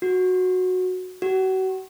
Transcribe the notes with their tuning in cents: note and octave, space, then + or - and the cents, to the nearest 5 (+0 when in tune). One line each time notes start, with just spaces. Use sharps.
F#4 -10
F#4 +35